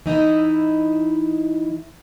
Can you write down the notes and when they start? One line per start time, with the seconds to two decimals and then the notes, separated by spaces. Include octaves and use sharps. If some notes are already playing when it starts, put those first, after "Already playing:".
0.06 E3 D#4 E4 D#5